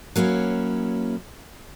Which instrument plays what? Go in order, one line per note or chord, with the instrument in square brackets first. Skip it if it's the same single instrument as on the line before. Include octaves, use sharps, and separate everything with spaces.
[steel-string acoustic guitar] F#3 A#3 C#4 E4